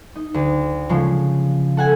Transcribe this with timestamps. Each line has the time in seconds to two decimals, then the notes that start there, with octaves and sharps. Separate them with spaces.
0.16 D#4
0.34 D2
0.89 C#3 F3 G#3
1.77 A4 F#5 G#5